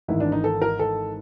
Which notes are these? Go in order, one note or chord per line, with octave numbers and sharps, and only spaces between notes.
G#1 G#2 E3 E4
D4
D#4
A4
A#4
A4